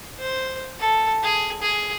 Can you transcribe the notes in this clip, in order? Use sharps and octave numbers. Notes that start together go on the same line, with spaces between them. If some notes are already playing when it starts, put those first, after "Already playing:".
C5
A4
G#4
G#4